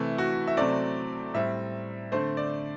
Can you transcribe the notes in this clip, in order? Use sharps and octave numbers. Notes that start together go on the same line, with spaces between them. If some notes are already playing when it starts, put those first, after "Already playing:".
Already playing: C3 E3 A3 E4
F#4
E5
C3 F#3 A3 C4 D5
A2 G3 C4 E5
D3 A3 C4 C5
D5